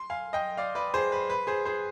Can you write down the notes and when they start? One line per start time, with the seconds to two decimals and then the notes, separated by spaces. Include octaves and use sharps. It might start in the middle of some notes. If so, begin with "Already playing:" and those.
Already playing: C6
0.10 F5 G#5
0.33 D#5 G5
0.57 D5 F5
0.75 B4 D5
0.94 G#4 C5
1.12 B4
1.30 B4
1.47 G#4 C5
1.65 G#4 C5